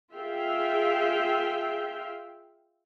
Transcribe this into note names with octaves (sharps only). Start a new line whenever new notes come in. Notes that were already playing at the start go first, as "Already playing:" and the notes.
F4 G#4 E5 F5 G5